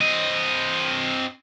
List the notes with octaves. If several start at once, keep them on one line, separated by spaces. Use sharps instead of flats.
C4 D#5